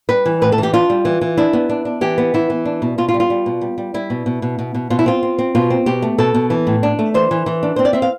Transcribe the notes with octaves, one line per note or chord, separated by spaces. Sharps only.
G3 B4
E3
A2 B4
A4
E3
G4
D4 F4
G3
E3
E3
D4 E4
B3
D4
D4
E3 G4
B3
E3 E4
E3
D4
B2
B2 F4
F4
G3
F4
G3
B2
G3
G3
G3 E4
B2
B2
B2
B2
B2
B2 F4
E4
C4 F4
C4
C4
B2 F4
C4
B2 G4
A3
B2 A4
B2
E3
A2
D4
A3
E3 C5
E3
E3
D4
C4 C5
D5
C4 E5
F5